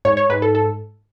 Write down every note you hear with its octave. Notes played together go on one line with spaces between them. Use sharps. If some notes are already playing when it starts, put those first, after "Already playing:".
G#2 C#5
C#5
G#2 B4
A4
A4